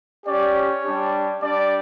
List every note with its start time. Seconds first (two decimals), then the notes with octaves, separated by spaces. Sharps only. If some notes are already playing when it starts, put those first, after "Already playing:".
0.25 C#4 G4 D5
0.55 C#5
0.83 G3 D4 G4
1.41 G3 D4 G4 D5